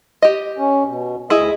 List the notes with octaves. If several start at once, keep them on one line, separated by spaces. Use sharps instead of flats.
G4 D#5
C#4
B2
D2 E4 G#4 D#5